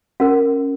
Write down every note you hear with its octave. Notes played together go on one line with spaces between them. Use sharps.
C#4 F#4 A#4